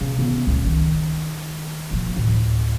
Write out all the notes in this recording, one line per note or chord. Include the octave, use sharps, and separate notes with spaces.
C#3
C#3 B3
C#2 A#2
D#3
A#2 F3
D2 A2